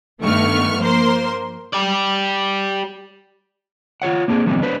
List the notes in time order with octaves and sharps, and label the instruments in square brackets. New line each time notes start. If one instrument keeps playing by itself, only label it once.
[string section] G2 D#3 A3 B3 C#6 F6
F3 A#3 A#4 C5 C6
[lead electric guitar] G4 D5
[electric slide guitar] F4 F#4 C#5 F#5
A#3 C4 D4 G#4 C5
D3 E3 F#3 G3 B3 C4
D4 B4 C5